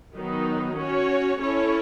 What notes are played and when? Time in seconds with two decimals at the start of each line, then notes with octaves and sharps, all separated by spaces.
0.15 D#3 F#3 B3 D#4
0.78 C#4 F#4 C#5
1.41 C#4 E4 A4 C#5